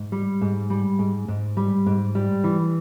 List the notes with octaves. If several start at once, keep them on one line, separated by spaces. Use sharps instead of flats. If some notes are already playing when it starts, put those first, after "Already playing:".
Already playing: G#2
G3
G#2
G3
G#2
G#2
G3
G#2
G3
E3